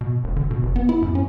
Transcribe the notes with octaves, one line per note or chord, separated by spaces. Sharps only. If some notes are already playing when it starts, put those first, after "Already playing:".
B2
E1
D3
B2
F1
B3
E4
F#2
C#4